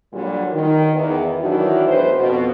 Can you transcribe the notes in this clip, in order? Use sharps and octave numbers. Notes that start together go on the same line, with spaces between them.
A#2 D3 F#3 G3
D#3
E2
D#3 E3 F#3 D4 E4 F#4
E2 A2 B4 C5
F2 B2